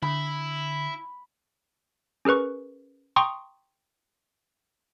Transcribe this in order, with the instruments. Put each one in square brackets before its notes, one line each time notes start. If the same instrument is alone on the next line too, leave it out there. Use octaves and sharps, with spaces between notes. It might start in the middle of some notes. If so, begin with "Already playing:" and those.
[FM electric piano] D3 [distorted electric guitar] E4 [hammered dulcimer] B5
[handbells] C#4 G#4 A#4 B4 C#6
G5 A#5 C6 C#6 D#6